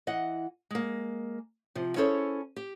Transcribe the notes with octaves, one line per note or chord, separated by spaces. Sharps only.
E3 D#5 F#5
G#3 A#3
C3 F3
C#4 E4 G#4 A4 C5 C#5
G4